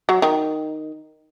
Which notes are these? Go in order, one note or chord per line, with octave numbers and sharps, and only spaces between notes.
F#3
D#3